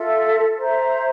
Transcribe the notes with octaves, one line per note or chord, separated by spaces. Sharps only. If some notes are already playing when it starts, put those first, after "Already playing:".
Already playing: F4 A4 E5
C5 E5 A#5